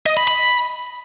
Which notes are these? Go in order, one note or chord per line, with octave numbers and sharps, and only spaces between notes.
D#5
B5
B5